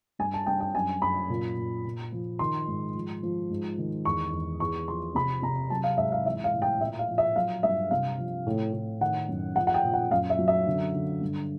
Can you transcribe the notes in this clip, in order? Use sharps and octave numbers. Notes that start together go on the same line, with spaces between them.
G2 G#5
A5
G2 G5
G5
F#2 G#5
F#2 B5
A#2
A#2
A#2
F3
D#3 C6
G#2
F3
F3
G#2
D#3
E2 C#6
E2
E2 C#6
F3 C6
C3 B5
C3 A#5
F#3 A5
F5
G#2 E5
F5
E3 E5
F5
A2
G5
A#2 E5
F5
F3
E5
F#3 F5
G2 E5
C3 F5
F3
A2
A2
D#3 F#5
F#2
F3 F#5
F#5
G5
A#2
F#5
F#2 F5
E5
F#3
E5
D3
D3
G2